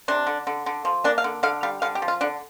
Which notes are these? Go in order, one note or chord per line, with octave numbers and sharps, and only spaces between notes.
C3 D4
D3
D3
D3
F3
A#3 D4
F5
D3
D3 F5
G3 F5
D3 F5
G4
F3
F4
D3 D4